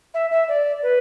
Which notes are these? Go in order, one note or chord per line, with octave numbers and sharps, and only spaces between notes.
E5
E5
D5
B4